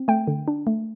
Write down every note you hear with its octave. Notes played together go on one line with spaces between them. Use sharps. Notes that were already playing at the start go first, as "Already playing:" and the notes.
Already playing: C4
A3 G5
D3
D4
A3